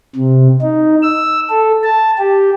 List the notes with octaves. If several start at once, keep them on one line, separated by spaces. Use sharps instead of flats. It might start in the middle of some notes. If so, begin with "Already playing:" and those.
C3
D#4
E6
A4
A5
G4